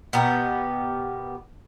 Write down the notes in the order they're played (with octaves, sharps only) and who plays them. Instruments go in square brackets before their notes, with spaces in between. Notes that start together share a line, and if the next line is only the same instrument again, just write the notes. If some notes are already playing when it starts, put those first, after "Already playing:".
[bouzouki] B2 B3 G4 A#4